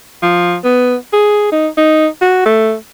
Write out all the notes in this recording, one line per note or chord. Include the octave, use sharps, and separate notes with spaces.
F3
B3
G#4
D#4
D#4
F#4
A3